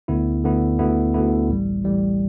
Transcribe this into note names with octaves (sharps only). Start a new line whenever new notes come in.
D2 D3 B3 E4
D2 D3 B3 E4
D2 D3 B3 E4
D2 D3 B3 E4
A1 A2 G3
A1 A2 G3